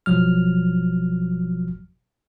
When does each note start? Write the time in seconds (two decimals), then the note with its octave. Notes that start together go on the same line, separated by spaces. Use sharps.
0.06 G1 B2 F3 F#3 F6